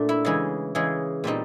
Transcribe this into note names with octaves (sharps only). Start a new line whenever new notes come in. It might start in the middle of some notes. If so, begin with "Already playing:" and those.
Already playing: A#2 A3 D4
E4
C#3 E3 G#3 G#4
C#3 E3 G#3 G#4
A#2 G3 C4 D#4